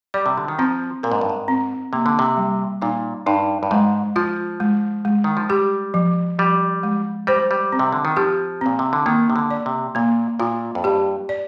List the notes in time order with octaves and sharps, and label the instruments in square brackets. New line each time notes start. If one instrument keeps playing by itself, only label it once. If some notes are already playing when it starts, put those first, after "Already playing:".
[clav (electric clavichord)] G3 [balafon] D5
[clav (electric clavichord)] C3
D3
D#3
[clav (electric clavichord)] F3 [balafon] C4
[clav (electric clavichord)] A#2 [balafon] A#4
[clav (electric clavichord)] G#2
G2
G#2
[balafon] C4
[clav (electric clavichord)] C3 [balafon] A#3
[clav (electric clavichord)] D3
C3
[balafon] G3
[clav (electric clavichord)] A#2 [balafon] D#4
[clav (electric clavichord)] G2 [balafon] D#4
[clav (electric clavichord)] G2
[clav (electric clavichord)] G#2 [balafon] G#3
[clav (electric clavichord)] F3 [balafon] F4
[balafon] G#3
G#3
[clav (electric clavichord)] D#3
F3
[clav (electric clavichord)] G3 [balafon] G4
[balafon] F3
[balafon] F3 [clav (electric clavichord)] G3
[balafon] G#3
[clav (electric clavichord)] G3 [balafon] C5
[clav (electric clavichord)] G3
[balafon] C4
[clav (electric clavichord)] C3
D3
D#3
[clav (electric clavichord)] F3 [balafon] G4
[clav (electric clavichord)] A#2 [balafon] C4
[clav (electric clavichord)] C3
D3
[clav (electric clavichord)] D#3 [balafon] A#3
[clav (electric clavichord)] C3
D3
[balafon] D5
[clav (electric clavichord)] C3
[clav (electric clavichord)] A#2 [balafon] A#3
[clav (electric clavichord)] A#2 [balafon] F4
[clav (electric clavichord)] F2
[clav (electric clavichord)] G2 [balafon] G4
[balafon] D5